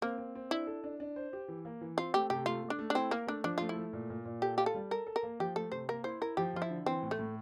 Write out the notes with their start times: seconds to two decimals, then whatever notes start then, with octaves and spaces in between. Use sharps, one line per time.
0.02 A#3 C4
0.18 C4
0.35 C4
0.51 D4 E4
0.67 A4
0.84 D4
1.00 D4
1.16 C5
1.33 G4
1.48 E3
1.65 A#3
1.81 E3
1.97 C4 F4
2.14 A3 G4
2.30 C3 G4
2.46 A3 F4
2.63 A3
2.70 D4
2.79 A3
2.90 D4
2.95 C4 E4
3.11 A#3 A#4
3.27 A3 D4
3.44 F3 D4
3.58 A3 F4
3.69 E4
3.77 A3
3.93 A#2
4.10 A#2
4.25 A#2
4.42 G4 A4
4.58 F4 G4
4.66 A4
4.74 G3
4.91 A4 A#4
5.07 A4
5.16 A#4
5.23 A#3
5.40 F3 G4
5.56 A3 A4
5.72 C3 C5
5.88 A#3 A#4
6.04 E4 C5
6.21 E4 A#4
6.37 F3 G4
6.54 F3 F4
6.62 E4
6.70 D3
6.86 E3 C4
7.02 A2
7.11 A3
7.19 A2